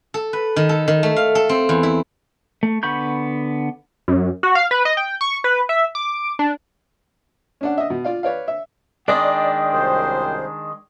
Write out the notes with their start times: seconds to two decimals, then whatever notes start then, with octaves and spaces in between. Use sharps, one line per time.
0.14 A4
0.33 B4
0.56 D#3
0.69 A4
0.88 D#3
1.03 A3
1.16 F5
1.35 A4
1.49 C4
1.69 E2
1.83 E4
2.63 A3
2.83 D3 B3 B5 C#6 G6
4.08 F#2
4.43 F#4
4.55 F5
4.71 B4
4.85 D#5
4.97 G5
5.21 C#6
5.44 B4
5.69 E5
5.95 D6
6.39 D4
7.61 C#4 D4 F#5
7.78 D#5 E5
7.90 B2
8.04 F4 D5 F5
8.23 B4 C#5 D5 F5
8.48 E5
9.08 D#3 G#3 D4 D5 D#5 G5
9.73 C2 F#2 C5